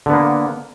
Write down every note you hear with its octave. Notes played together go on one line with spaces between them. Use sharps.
D3 A#3 B3